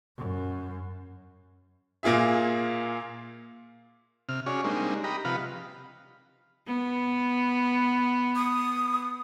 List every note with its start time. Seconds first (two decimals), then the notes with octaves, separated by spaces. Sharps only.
0.17 F#2
2.03 A#2 A#3 F4 G#4 E5
4.29 C3 F6
4.46 C#4 F#4 G#4 C#5 D5
4.64 G3 G#3 A#3 C4 D4 D#4
5.04 G4 D#5 A#5 B5
5.25 C3 F3 B4 F5 F#5 B5
6.66 B3
8.35 D#6